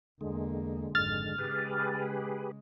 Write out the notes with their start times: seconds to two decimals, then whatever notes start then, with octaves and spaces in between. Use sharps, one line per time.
0.21 E2 D3 G#3 A#3
0.95 G#1 F2 F6 A6
1.38 C#3 G#3 G4 G#4 B4